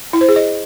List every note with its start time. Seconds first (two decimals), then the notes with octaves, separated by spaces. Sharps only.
0.13 E4
0.21 C5
0.29 G#4
0.36 D#5